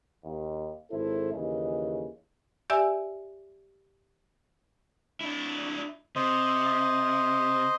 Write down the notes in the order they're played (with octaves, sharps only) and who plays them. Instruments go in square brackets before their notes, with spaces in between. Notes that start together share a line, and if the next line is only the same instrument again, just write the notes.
[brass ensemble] D#2
G#1 E4 A4 C5
D#2 C#3 E3 D#5
[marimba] G4 D5 E5 G#5 E6
[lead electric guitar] D4 E4
[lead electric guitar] C3 [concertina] C5 D#5